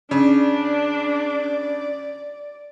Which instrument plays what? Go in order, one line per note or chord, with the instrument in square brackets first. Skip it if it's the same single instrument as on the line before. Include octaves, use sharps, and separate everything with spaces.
[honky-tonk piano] C#3 [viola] D4 [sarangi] D5